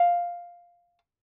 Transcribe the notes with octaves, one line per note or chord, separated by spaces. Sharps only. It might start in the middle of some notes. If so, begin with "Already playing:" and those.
Already playing: F5